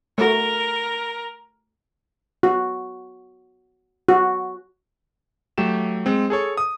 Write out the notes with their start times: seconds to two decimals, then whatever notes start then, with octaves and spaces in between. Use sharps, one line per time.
0.18 A3 F#4 A#4
2.43 F#4
4.09 F#4
5.58 F#3 A3 G4 E7
6.06 G#3 C4
6.30 G#4 A4 C#5
6.57 D#6